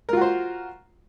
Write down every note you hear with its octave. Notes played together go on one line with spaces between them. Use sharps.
F4 F#4 A#4 C5